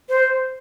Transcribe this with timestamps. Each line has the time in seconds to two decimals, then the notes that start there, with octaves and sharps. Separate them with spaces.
0.09 C5